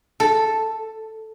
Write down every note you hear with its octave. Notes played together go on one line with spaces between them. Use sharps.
A4